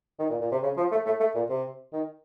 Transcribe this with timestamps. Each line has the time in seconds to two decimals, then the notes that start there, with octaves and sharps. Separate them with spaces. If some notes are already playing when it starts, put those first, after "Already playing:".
0.19 D#3
0.30 A#2
0.41 A#2
0.52 C3
0.63 C#3
0.77 F3
0.92 A3
1.06 A3
1.20 A3
1.35 A#2
1.49 C3
1.93 D#3